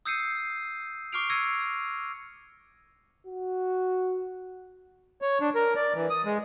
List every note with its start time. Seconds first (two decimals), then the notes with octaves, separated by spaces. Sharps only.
0.05 D#6 E6 G6 C7 C#7 D#7
1.12 C#6 D6 F6 C7 D7 F7
1.30 E6 G#6 A#6 C#7 D#7
3.27 F#4
5.22 C#5
5.41 D4
5.55 A#4
5.76 D5
5.94 E3
6.10 D#6
6.25 G#3